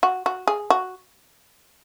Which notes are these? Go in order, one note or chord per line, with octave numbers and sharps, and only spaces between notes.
F#4
F#4
G#4
F#4